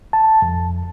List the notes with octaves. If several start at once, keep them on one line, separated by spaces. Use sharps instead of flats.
A5
F2